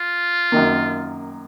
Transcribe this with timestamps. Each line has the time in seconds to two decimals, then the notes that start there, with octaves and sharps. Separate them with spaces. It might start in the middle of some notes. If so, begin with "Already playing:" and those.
Already playing: F4
0.52 F#2 D#3 A#3